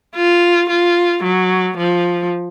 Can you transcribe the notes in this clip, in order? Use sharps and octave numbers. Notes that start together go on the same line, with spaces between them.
F4
F4
F#3
F3